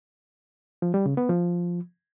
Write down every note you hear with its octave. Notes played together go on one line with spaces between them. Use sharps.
F3
G3
C#3
B3
F3